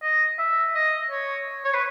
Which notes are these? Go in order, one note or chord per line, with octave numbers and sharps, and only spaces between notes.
D#5
E5
D#5
C#5
C#5
B4